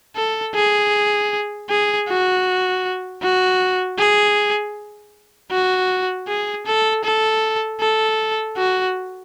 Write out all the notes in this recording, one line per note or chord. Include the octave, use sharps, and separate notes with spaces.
A4
G#4
G#4
F#4
F#4
G#4
F#4
G#4
A4
A4
A4
F#4